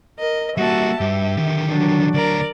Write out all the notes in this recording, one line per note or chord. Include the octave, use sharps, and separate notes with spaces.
A#4 D#5
G3 A#3 F#4 E5 A5
G2 G4
D3 D#3
F#3 D4
D2 A#4 D5 A#5